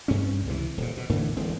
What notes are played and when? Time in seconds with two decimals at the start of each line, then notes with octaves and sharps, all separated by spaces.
0.08 G2 C4 C#4
0.46 C#2 C3 E3
0.78 D#1 A#2
0.97 B2
1.10 A2 D3 E3 A3
1.36 D1 E2 G#3 C4